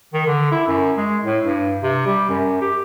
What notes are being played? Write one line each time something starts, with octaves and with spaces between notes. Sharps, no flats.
D#3
D3
E4
F#2
G#3
A2
G2
C3
G3
F#2
G4